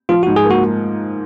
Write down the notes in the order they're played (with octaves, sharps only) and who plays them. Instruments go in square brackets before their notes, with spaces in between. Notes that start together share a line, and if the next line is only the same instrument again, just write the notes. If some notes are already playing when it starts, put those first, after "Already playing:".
[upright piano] F3 [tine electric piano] F4
[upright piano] G#2 [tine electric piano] F#4
[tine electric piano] G#4
[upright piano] A#3
[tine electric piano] F#4